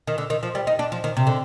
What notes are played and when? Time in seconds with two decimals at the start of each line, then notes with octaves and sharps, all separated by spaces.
0.07 D#3
0.18 D3
0.30 D#3
0.43 F3
0.55 G3
0.67 D#4
0.79 D4
0.92 F3
1.04 D#3
1.17 C3
1.27 D3